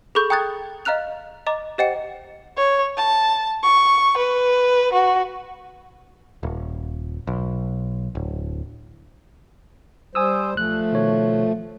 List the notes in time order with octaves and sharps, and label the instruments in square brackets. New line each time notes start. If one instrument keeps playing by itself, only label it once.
[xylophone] G#4 A4 B5 C#6 G6
G5 A#5 D#6 F#6 G#6 A6
D#5 F5 A#5 F6 F#6 F7
D#5 A#5 D6
G4 C5 D#5 F#5 G5 C#7
[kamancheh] C#5
A5
C#6
B4
F#4
[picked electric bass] D#1
B1
D1
[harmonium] G3 C5 [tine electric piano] G#5 D#6 E6
[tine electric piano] B1 F#6 [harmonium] F3 A3
[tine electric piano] B2 D#3 C#5